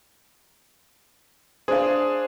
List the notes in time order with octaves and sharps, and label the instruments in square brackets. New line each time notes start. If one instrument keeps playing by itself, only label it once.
[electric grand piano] D4 G#4 [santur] C5 F5